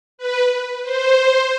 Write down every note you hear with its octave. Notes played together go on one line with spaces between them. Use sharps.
B4
C5